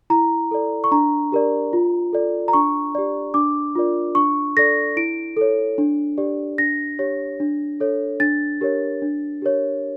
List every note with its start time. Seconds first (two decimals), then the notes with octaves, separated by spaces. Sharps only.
0.10 E4 A#5
0.51 A4 D5
0.84 C#6
0.91 D4 A#5
1.32 G4 A#4 D5
1.73 F4
2.13 A4 D5
2.48 A#5
2.53 D4 C#6
2.95 G4 D5
3.34 D4 D6
3.75 F4 A#4 D5
4.15 D4 C#6
4.57 A4 D5 A#6
4.97 E4 D7
5.37 A4 C#5
5.78 D4
6.18 G4 D5
6.58 D4 A#6
6.99 G4 C#5
7.40 D4
7.80 A4 C#5
8.20 D4 A6
8.61 G4 A#4 C#5
9.02 D4
9.42 G4 A#4 C#5